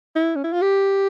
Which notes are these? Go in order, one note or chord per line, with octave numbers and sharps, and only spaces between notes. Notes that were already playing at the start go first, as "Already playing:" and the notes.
E4
C#4
E4
F4
G4